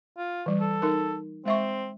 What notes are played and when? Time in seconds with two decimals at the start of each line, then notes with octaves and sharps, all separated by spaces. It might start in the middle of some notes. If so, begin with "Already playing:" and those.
0.18 F4
0.46 E3 G3
0.61 A4
0.82 D#4 A#4
1.45 G#3 C4 E5 C#6